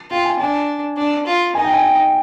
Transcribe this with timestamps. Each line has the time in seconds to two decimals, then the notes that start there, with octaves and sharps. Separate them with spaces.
0.10 F4 G5
0.25 G#5
0.39 D4 G#5
0.97 D4
1.26 F4
1.55 D#4 G#5
1.64 G5
1.74 G#5
1.83 G5